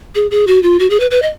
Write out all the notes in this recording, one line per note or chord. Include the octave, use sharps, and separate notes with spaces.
G#4
G#4
F#4
F4
F#4
G#4
B4
B4
D#5